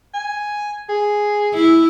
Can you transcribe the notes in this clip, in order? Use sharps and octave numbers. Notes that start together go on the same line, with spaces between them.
G#5
G#4
E4